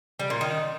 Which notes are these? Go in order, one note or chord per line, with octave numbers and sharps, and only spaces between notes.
G3
A#2
D#3